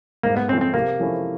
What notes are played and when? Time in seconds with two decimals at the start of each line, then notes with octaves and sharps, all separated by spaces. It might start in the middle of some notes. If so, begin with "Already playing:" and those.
0.23 G#2 A#3
0.37 B3
0.49 F3 A3 C4 C#4
0.61 C4
0.74 C3 A#3
1.00 F3 A3 C#4 E4